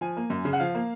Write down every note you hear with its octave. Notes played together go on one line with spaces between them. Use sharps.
F3 G#5
A#3
F#2
C#3
F#5
F3 F5
A#3